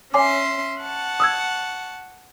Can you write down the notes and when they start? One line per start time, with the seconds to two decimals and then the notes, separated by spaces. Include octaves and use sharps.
0.14 C#4 C#5 E5 G#5 C6 D6
0.82 F#5 A5 C#6
1.20 D#6 E6 G#6